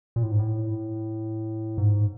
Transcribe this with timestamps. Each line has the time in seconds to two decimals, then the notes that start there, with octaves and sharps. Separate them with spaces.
0.16 A#2
0.23 A2
0.31 G#2
0.39 A2
1.78 G#2